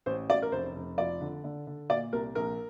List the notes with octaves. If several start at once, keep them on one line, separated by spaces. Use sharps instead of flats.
A1 C5
A1 D5
A#4
F1 C5
F1
F3 D5
D3
D3
D3
A#2 D5
C2 A#4
A#1 A#4